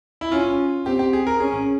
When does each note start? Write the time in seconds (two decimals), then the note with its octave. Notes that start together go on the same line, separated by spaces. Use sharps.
0.21 E4
0.32 C#4 F4
0.86 C4 G4
0.99 G4
1.13 G#4
1.27 A#4
1.40 C#4 G#4